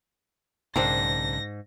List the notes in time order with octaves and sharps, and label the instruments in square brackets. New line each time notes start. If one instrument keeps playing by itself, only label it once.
[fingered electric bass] B1 C#3 [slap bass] G#2 [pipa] A#3 C4 D4 [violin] A#6